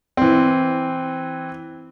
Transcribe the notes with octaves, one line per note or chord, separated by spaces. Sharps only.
E3 C4